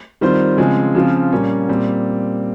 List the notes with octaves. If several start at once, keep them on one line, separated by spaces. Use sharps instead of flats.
D#3 G3 C4 F4 C5
C#3 F3 G#3 C4
C#3 F3 C4 F4
A#2 G3 A#3 C#4
A#2 G3 C4